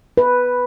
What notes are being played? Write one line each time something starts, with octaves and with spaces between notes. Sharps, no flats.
B4